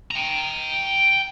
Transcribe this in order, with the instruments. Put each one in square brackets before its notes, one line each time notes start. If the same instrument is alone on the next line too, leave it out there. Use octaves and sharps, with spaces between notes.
[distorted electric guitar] G5 A#5